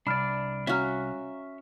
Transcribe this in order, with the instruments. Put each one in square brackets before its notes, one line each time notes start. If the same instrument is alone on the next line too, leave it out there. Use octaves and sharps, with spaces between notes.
[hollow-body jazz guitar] C2 [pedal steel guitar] D4 D5 [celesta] B5 F6
[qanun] C#4 F#4 [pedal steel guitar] E5 C#6 F6 [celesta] F5 A#5